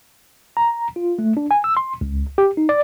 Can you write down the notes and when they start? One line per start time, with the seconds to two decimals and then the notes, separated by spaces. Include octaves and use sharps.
0.57 A#5
0.96 F4
1.19 A3
1.37 D4
1.51 G#5
1.64 E6
1.77 C6
2.01 C#2
2.38 G4
2.57 D#4
2.69 D5